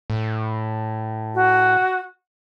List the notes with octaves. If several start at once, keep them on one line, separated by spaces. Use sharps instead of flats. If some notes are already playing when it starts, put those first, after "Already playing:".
A2
F#4